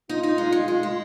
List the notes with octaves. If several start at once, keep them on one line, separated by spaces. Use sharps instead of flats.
D#4 F4
D#4
G#3
G#3
G#3
G#3